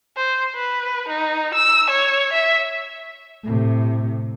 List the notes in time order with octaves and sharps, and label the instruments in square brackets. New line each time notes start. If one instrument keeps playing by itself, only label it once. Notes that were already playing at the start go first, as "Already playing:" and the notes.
[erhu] C5
B4
D#4
E6
C#5
E5
[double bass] A2 C3